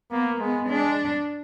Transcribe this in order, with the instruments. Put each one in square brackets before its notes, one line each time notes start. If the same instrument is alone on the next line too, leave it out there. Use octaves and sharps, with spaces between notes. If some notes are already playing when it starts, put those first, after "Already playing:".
[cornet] A#3 [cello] B3
[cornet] G#3 [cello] B3
[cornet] G#3 [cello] D4